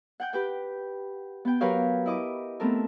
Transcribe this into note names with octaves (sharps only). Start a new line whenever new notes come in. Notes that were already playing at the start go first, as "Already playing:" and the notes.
F#5 G5 G6
G4 B4 G5
B3 G5
F#3 G4 A#4 B4 C#5 F5
E4 D#5 D6
A3 B3 C4 A4 A#4